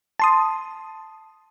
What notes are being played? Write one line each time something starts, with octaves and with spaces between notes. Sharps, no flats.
A5 C6 D#6